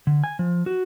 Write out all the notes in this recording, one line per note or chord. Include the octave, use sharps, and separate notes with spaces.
D3
G#5
F3
F#4